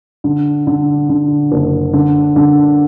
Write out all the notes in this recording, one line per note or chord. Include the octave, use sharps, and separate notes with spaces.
D3
D3
D3
F#1
D3
D3